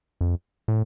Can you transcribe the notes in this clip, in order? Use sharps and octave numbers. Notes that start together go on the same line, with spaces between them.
F2
A2